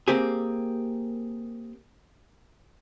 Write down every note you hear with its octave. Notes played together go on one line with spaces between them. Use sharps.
A#3 C4 G4 G#4